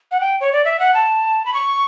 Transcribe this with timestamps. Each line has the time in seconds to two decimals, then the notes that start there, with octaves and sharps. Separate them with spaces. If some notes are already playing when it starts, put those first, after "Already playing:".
0.11 F#5
0.20 G5
0.41 C#5
0.53 D5
0.65 E5
0.79 F#5
0.94 A5
1.45 B5
1.54 C#6